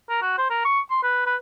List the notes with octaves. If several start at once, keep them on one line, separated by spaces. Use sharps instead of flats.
A#4
F#4
C5
A#4
C#6
C6
B4
B4